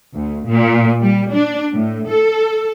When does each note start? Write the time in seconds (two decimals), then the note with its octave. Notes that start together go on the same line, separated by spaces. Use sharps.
0.16 D2
0.48 A#2
1.01 G3
1.33 D4
1.74 A2
2.10 A4